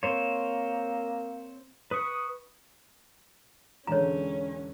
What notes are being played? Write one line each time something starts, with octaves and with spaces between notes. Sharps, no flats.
A#3 C4 C5 C#5
B4 C#6 D#6
E1 D3 G#3 C#4 C#5 A#5